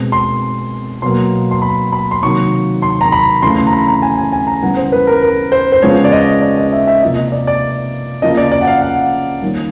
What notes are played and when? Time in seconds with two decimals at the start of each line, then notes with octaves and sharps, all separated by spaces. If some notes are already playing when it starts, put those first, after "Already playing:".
Already playing: B2 G#3 C4
0.12 C6
1.02 B2 F#3 A#3 C6
1.51 C6
1.62 B5
1.93 B5
2.11 C6
2.22 C3 D#3 F#3 A#3 C#6
2.82 C6
3.01 A#5
3.12 B5
3.42 C#3 E3 A3 C6
3.58 C6
3.67 A#5
3.73 B5
3.87 A#5
4.02 G#5
4.17 G#5
4.33 G#5
4.47 A#5
4.62 C#3 E3 G3 B3 F#5
4.77 C5
4.92 B4
5.07 A#4
5.22 A#4
5.52 C5
5.72 C5
5.82 C#3 F3 G#3 B3 C#5
6.04 D5
6.12 D#5
6.42 D5
6.57 D#5
6.73 E5
6.87 E5
7.02 C3 F3 A#3 C#4 D#5
7.17 D#5
7.32 D5
7.47 D5
8.22 C#3 F3 A#3 D#5
8.37 D5
8.52 D5
8.61 F#5
8.67 F5
8.82 F#5
9.42 D#3 G3 A#3 C#4